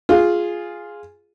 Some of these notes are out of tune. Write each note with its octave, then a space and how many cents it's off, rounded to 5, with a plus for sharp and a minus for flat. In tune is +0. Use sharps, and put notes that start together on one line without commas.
F4 +0 G#4 +0